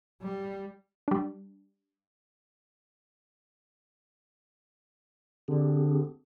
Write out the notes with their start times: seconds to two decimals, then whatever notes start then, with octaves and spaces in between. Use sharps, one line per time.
0.22 G3
1.08 G3 D4
5.48 D3 C4 G4 G#4